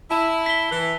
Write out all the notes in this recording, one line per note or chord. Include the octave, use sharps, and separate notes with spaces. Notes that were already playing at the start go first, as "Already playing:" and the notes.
E4 A5
B6 G7
E3